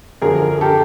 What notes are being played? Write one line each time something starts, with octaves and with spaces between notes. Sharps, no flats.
F#2 D3 F3 G#4 A#4
G4 A4